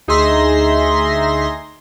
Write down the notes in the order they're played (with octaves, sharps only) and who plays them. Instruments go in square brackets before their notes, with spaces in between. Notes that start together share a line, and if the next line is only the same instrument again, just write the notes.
[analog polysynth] D2 D#4 G#4 E5 C6 A#6